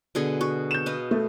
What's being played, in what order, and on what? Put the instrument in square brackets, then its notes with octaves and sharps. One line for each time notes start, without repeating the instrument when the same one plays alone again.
[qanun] B2 D3 G#4
F#4
[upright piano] G6 E7
[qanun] B4 D#5 F5
[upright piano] A3